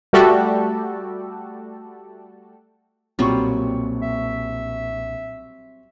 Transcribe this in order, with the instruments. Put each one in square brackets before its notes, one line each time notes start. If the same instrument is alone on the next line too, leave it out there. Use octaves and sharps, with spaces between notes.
[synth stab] G3 A3 F#4 G4 A4 D5
[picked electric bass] B1 A#2 A#3 [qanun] F#3 G3 F4 [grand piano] C4 C#6
[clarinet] E5